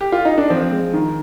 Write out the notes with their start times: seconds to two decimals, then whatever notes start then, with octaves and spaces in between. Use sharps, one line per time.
0.01 G4
0.12 F4
0.25 D#4
0.38 D4
0.50 F3 C4
0.71 G#3
0.94 D#3